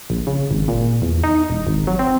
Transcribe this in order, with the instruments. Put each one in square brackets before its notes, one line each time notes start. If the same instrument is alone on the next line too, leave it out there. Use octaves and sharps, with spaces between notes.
[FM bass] A#1
C#3
G#1
A#2
E2
D#4
E1
G#1
F#3
C4